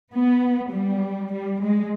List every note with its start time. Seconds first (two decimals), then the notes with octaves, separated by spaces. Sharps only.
0.12 B3
0.70 G3
1.32 G3
1.62 G#3